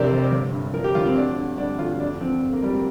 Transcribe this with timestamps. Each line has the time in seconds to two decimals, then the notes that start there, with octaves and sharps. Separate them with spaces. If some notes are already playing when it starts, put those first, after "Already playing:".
Already playing: F1 F2 C3 D4 G4 A#4 C5 D5
0.11 F1
0.32 G1
0.52 G2
0.73 F3 A#4
0.84 G4
0.95 G1 F4
1.06 C4
1.16 D2 D4
1.37 D3
1.58 G3 D4
1.79 D2 F4
2.00 F2 D4
2.21 F3 C4
2.42 F2
2.53 A#3
2.63 F3 G3
2.74 A#3